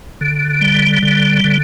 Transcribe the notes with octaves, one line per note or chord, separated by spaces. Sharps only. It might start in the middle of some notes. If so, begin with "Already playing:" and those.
D3
G3
D3
D3